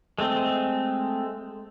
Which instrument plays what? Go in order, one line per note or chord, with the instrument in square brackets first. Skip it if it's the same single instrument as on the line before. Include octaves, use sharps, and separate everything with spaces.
[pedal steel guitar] G#3 A3 C4 [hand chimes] A4